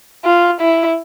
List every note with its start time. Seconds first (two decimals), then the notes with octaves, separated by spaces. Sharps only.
0.25 F4
0.61 E4